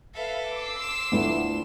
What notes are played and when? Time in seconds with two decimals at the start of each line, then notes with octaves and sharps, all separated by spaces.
0.15 A4 B4 E5 F5
0.48 D6 E6 C7
0.79 C6 E7
1.12 D2 A3 B3 E4 F4